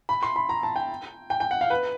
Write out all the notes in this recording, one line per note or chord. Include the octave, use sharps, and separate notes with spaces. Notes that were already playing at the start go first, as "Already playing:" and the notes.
B5
C6
B5
A#5
A5
G5
G5
G5
F#5
F5
B4